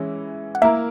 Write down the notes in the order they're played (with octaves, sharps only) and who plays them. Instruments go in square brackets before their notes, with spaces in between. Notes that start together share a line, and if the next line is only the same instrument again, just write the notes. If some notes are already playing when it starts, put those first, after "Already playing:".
Already playing: [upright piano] E3 G#3 C#4 E4
[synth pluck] F#5
[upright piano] A#3 E4 A#4 [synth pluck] E5